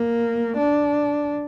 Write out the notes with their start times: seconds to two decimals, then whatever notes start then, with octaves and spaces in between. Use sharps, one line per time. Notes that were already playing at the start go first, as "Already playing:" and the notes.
Already playing: A#3
0.57 D4